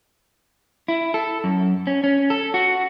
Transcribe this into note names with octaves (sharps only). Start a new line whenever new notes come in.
E4
A4
F#2
C#4
C#4
A4
F#4